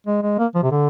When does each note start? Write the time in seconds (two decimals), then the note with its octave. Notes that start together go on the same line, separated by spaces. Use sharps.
0.06 G#3
0.22 G#3
0.39 A#3
0.55 F3
0.63 C3
0.71 D3